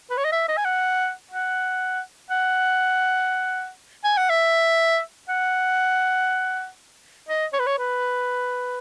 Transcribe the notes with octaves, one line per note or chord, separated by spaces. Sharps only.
B4
C#5
D#5
E5
D#5
G#5
F#5
F#5
F#5
G#5
F#5
E5
F#5
D#5
C#5
B4
C#5
B4